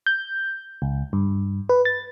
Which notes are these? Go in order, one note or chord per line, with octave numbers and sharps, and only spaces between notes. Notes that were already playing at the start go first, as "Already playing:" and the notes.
G6
C#2
G2
B4
A6